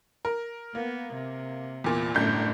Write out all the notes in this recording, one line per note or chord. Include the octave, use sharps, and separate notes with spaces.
A#4
A#3 B3
C3
E2 A#2
G1 F#2 A2 A3 D4 G6